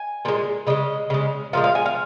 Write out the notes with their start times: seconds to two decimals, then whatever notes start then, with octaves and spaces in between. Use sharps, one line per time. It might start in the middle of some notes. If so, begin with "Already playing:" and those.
Already playing: G#5
0.25 A#2 F3
0.28 G#3
0.67 C#3 G#3 D#5
1.10 C#3 G#3
1.53 A#2 F3 G#3 F5
1.64 F5
1.75 G#5
1.86 F5